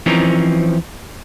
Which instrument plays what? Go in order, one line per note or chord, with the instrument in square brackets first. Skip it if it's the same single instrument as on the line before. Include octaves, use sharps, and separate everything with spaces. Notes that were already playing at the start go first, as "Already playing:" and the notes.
[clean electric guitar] E3 F3 C4 C#4 D#4 A#4